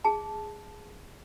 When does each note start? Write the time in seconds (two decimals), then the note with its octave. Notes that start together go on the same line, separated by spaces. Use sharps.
0.04 G#4 A5